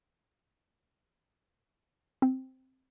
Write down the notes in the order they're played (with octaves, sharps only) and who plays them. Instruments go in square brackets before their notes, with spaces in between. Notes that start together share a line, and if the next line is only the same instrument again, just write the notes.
[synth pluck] C4